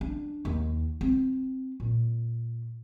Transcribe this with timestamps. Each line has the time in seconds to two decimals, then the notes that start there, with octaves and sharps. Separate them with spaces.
0.01 D4
0.45 D#2
1.01 C4
1.80 A#2